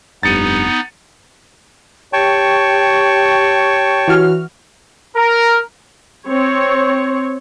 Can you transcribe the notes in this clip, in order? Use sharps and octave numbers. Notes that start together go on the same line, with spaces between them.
F1 G2 B3 D#4 A6 C#7 D#7
G4 C#5 G5 A5 C#6
E3 F#4 F6
A#4
C4 C#5